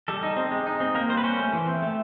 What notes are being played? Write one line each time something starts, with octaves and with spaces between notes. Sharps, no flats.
G3 A4
D#4
C4
G#3
D#4
C4
A#3 A#4
G3 C5
B4
C#4 C5
A3
E3
C4
A3